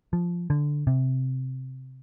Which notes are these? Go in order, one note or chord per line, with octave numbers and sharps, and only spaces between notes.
F3
D3
C3